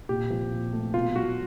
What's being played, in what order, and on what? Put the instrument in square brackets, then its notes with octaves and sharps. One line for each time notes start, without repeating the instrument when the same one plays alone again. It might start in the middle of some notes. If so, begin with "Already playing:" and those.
[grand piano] A#2 [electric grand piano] G4
[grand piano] F3
A#2
A3
[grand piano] B2 [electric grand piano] F4
[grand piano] F#3 [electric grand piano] F#4